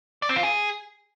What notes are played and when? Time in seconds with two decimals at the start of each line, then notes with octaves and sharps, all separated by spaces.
0.22 D5
0.29 C4
0.36 F4
0.43 G#4